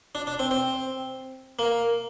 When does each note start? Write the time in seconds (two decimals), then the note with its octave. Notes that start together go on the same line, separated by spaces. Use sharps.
0.15 D4
0.27 D4
0.39 C4
0.51 C4
1.59 A#3